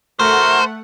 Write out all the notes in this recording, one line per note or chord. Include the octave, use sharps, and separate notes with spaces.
A3 F#4 A#4 C5 F#5